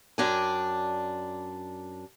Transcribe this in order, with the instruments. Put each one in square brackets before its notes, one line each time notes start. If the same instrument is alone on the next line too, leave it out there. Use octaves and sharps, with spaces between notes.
[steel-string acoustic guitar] F#2 D4 G5 G#5